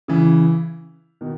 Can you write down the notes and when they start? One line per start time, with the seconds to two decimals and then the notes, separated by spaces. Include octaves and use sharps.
0.08 C#3 E3
1.21 B2 D#3